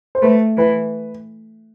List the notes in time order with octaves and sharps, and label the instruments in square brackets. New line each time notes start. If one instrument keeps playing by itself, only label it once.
[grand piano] C5
[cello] A3 [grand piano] B4
[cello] E3 [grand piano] B4